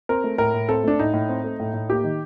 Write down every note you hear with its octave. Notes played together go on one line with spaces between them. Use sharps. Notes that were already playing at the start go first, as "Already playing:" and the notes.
C4 A#4
A3
A2 A#4
A2
C4 A4
A3 D4
A2 D#4
A2
C4
A3
A2
A2
A#3 G4
D#3